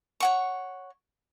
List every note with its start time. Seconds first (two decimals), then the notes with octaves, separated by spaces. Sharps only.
0.20 C#5 F#5 C#6